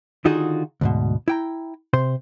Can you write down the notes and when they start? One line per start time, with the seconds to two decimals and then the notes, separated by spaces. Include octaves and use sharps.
0.25 D3 D#3 D#4 F4 F#4 G#4
0.81 D2 G#2 B2
1.28 E4 G5 A#5
1.93 C3 C5 C6